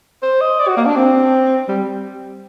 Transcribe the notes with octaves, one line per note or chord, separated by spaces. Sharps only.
C5
D#5
D5
F#4
A#3
D4
C4
G3